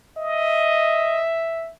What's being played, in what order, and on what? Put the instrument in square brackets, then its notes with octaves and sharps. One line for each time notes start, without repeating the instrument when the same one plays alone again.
[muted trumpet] D#5 [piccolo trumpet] E5